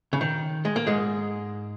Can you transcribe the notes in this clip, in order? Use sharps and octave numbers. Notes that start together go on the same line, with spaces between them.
C#3
D#3
G#3
A#3
G#2 G#3